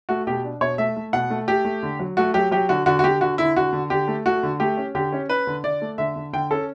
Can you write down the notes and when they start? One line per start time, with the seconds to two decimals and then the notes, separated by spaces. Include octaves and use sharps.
0.09 A3 F#4
0.27 B2 G4
0.44 D4
0.61 B2 C#5
0.78 A3 E5
0.97 A3
1.13 B2 F#5
1.30 A3
1.48 A3 G4
1.65 A3
1.83 D3
1.99 F#3
2.17 A3 F#4
2.34 F#3 G4
2.51 F#3 G4
2.69 D3 F#4
2.86 D3 F#4
2.99 F#4
3.04 D3 G4
3.21 D3 F#4
3.38 D3 E4
3.56 D3 F#4
3.73 D3
3.90 D3 G4
4.08 A3
4.26 A3 F#4
4.43 D3
4.60 A3 G4
4.77 C#4
4.95 D3 G4
5.13 C#4
5.29 C#4 B4
5.47 D3
5.64 D3 D5
5.82 A3
5.98 D3 E5
6.16 D3
6.33 D3 G5
6.50 C#4 A4